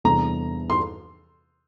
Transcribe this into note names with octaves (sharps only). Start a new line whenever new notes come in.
E2 C3 G3 D4 A4 A#5
C6